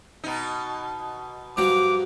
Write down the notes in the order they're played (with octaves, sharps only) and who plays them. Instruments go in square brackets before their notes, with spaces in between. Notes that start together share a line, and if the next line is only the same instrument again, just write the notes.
[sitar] B2 D#4
[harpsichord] G2 F3 F#3 [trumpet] D6